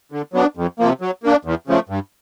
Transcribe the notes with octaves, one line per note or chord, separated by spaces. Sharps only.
D3
F#3 B3 D4
F2
C3 F3 A#3
F#3
A#3 D4
E2
C#3 F3 A3
G2